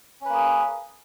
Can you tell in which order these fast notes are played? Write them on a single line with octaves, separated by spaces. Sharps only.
C#4 B4 A#3 G#4